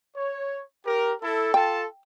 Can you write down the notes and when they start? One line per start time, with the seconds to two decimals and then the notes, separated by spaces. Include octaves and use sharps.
0.15 C#5
0.84 G4 A#4
1.21 E4 A4
1.54 F4 A4 G5 A5